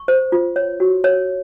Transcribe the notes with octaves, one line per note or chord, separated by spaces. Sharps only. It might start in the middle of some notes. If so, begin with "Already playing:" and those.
Already playing: C#6
C5
F4
C#5
F#4
C#5